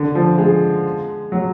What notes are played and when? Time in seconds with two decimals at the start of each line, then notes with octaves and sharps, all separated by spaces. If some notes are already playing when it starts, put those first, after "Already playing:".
Already playing: D3
0.15 F3
0.38 G#3
1.32 F#3